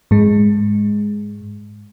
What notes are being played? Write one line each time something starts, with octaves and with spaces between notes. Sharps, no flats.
G#2 G#3